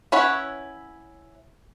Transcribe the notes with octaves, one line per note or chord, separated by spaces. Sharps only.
C#4 E4 B4 C#5 F#5